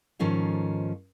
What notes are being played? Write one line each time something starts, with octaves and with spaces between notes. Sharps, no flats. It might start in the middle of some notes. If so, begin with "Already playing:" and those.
G#2 D#3 F3 C#4 A4 F5